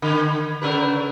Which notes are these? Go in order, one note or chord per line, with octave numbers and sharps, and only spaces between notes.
D3
C#3 A#4 B4